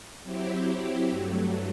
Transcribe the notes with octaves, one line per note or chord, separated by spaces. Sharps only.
F#3 C4 E4 G4
G2 F#3 A3